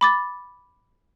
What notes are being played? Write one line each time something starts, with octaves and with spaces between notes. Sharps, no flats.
B5 D6 A6